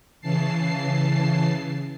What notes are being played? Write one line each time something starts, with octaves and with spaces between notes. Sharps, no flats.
C#3 E3 A5 C7